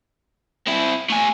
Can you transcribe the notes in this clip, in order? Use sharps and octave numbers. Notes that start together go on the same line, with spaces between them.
C4 E4
A3 G#5